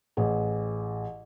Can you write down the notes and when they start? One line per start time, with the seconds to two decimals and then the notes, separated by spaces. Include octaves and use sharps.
0.17 A1 G#4